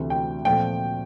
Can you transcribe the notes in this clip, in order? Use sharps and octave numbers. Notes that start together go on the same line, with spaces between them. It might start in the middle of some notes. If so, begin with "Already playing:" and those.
Already playing: D2 C3 E3 A3
G5
A#2 F3 A3 C4 G5